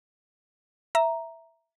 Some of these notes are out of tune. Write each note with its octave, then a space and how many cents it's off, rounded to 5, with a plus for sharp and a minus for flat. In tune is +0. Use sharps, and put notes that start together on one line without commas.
E5 +0 A#5 +0